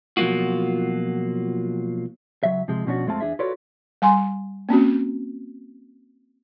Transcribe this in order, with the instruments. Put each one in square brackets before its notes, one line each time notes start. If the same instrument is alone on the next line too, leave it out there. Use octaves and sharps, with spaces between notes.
[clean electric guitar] B2 F3 F#3 A#3 F4 F#4
C#2 F#3 E5
C3 F3 G#3
B2 F3 C#4 D4 F#4
F2 G#3 A3 C4 F4 A5
E2 D4 G#4 E5
F4 F#4 A4 B4 C#5 D5
[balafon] G3 G#5 C6
A#3 C4 C#4 F#4